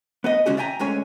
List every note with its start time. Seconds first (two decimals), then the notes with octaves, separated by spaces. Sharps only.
0.24 B3 B4 D#5
0.46 D3 G#3 C#4 F#4 G#4
0.57 D5 E5 G5 G#5 A#5
0.80 D2 D3 G#3 C#4 C#5 G#5